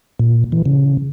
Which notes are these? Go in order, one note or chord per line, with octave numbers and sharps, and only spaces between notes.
A#2
E3
C#3